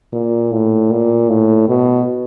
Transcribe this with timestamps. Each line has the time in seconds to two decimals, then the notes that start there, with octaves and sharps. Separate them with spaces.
0.13 A#2
0.52 A2
0.91 A#2
1.29 A2
1.69 B2